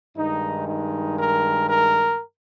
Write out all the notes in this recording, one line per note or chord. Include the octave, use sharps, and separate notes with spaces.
G2 D#3 G#3 D#4
D#4
A#4
A#4